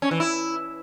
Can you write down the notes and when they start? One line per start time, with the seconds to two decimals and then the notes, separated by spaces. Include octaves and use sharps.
0.02 C#4
0.11 E3
0.20 E4